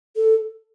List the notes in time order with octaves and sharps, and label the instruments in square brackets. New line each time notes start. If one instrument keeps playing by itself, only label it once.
[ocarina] A4